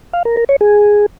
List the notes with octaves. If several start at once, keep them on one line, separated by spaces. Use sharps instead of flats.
F5
A#4
A#4
C#5
G#4